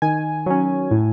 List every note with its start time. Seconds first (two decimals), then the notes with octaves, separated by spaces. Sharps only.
0.02 D#3 G#5
0.46 F#3 C#4
0.91 A2